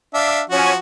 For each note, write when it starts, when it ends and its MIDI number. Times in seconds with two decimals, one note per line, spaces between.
0.14 0.41 62
0.14 0.41 76
0.14 0.41 77
0.50 0.77 53
0.50 0.70 61
0.50 0.77 66